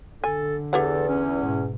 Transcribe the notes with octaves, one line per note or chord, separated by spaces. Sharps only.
D3 A4 G#5
E2 G4 A4 C#5 F#5
C#4
G#2 B2